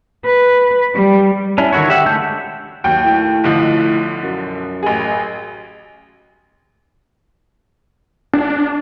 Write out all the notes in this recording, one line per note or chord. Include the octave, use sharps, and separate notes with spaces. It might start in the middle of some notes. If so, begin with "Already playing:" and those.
B4
G3
C#4 D4 E4
D3 D#3 E4 F#4 C#5
G4 E5 F#5 E6
D3 G#3 A3 A5 G6
D#2 F#3 G5
A2
B1 D3 F3
F#2
A1 G#4
D4